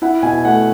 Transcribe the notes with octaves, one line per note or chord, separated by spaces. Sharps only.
E4 F#5
B2 G#5
A3 F#5